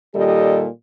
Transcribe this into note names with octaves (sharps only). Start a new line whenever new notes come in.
A#2 D#3 G3 G4 A4 D#5